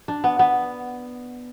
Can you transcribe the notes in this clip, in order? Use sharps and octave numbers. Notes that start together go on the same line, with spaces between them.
D4
B3
B3